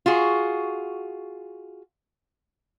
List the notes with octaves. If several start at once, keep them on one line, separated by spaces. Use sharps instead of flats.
F4 F#4 G#4